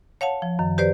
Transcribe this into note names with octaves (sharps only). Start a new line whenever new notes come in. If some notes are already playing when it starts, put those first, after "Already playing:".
C#5 F5 F#5 A5
F3
F#2 D#3
G4 B4 C5 D5